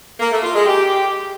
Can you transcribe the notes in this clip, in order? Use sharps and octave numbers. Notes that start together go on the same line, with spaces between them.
A#3
A3
F4
G#3
G4